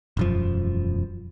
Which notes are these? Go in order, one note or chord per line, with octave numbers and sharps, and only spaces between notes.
E1 F#2 F3